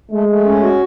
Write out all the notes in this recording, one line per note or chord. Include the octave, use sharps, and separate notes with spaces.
G#3 A3
A3
C#4
F#4